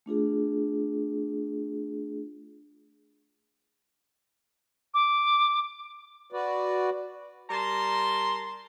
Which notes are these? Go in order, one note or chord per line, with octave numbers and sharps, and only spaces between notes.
A3 D4 F4 G#4
D6
F#4 B4 D5
G3 A#4 A5 A#5 C6